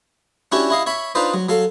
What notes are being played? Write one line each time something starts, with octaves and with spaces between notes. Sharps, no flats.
C#4 D4 E4 F#4 G4 C#5
E4 D#5 F5
C#5 E5 B5
D4 D#4 F4 B4 C5 D5
F#3
F#3 A4 F5